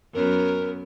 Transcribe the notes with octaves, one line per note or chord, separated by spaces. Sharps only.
F#2 B3 A#4